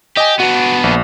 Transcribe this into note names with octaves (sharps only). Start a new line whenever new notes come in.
G4 D#5 G#5
B3 D4 F#4
A#1